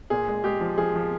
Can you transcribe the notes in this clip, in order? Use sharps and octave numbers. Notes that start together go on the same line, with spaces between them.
A#2 G#4
G#3
G#3 G4
F3
F3 G#4
F3